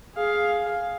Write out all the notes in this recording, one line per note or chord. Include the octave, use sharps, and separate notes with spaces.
G#4 F5